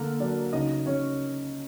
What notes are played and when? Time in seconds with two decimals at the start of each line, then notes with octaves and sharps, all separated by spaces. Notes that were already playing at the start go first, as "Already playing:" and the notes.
Already playing: D3 A#3 A4 A#4
0.20 F#3 D4 D5
0.53 C#3 D#4 D#5
0.86 C#3 C#4 C#5